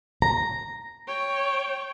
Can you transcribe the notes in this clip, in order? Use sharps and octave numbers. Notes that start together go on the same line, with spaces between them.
A#5
C#5 G5